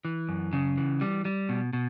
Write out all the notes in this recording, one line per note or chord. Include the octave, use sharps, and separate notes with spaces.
E3
F#2
C#3
E3
G3
G3
B2
B2